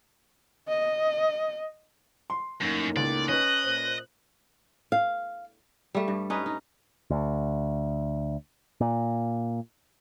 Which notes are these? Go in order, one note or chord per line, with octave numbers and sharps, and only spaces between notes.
D#5
C6
F#2 A2 A#3 D#4
C#2 D5
C#4 B4 D#5 F#6
A#2 C5
F5
G3 A3
G2
C#4 D#4 B4
D#4
D2
A#2